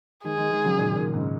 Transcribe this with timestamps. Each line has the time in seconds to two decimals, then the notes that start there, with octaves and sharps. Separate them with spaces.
0.24 D#3 G#3 G#4
0.38 D#3 G#3
0.51 D#3 G#3
0.64 C#3 F#3
0.78 A#2 D#3
0.96 A#2 D#3
1.14 G#2 C#3